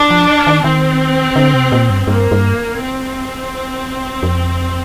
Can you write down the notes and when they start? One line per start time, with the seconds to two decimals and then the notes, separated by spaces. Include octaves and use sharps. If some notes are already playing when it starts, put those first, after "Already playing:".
Already playing: D4
0.10 F3
0.47 D#3
0.64 D#3 C4
1.36 D3
1.54 C3
1.72 A#2
1.90 G2
2.07 G2 A#3
2.31 G2
2.80 C4
4.23 F2